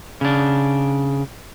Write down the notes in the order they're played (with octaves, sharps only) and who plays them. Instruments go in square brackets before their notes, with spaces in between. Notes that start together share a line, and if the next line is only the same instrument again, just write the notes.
[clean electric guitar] C#3 D4